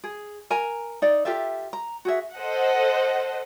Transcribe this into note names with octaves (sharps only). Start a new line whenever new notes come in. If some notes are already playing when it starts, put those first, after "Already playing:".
G#4
A#4 G#5 A#5
D#4 D5
F4 G4 A4 E5
A#5
F#4 G#4 E5
A4 C5 D#5 F#5